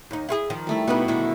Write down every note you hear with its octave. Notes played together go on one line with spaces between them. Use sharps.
D#2 D#4
E4 F4 G#4
D#3 F3
G3 A3 E4
B2 B3 D#4 B4
D3 D#3 E4